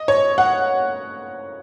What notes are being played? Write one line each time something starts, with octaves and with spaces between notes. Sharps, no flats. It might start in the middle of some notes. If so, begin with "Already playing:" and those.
Already playing: D#5
C#5
F#5